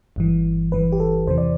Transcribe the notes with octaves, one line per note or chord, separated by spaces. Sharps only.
G1 G2 E3
G1 G2 E3 B4
G4
A4
E2 C3 E3 C5
D5